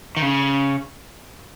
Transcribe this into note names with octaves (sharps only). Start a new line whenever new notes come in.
D#3
C#3